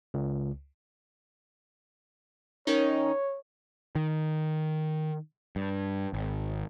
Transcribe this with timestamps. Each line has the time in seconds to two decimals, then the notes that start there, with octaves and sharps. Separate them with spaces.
0.14 C#2
2.67 D#3 C#4 D#4 C#5
3.95 D#3
5.56 G2
6.13 G#1